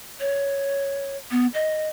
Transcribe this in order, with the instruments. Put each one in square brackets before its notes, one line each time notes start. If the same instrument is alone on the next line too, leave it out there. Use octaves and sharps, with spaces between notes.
[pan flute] C#5
B3
D#5